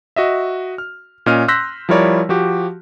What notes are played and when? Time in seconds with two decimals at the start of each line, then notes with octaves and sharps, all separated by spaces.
0.16 F#4 D#5 E5
0.78 F6
1.26 A#2 C#4 D#5 F6 D#7
1.48 C6 E6 F#6 G6 A#6 B6
1.89 F3 G3 E4 A#4 C#5 D5
2.29 F3 F#4 G4